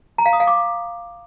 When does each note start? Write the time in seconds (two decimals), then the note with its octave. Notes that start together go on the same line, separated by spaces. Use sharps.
0.18 A#5
0.26 F5
0.33 D#6
0.40 F5
0.47 D6